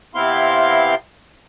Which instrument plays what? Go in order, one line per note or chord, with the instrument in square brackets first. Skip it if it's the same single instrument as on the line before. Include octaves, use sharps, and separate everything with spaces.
[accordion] C3 B3 C4 E4 F5 C6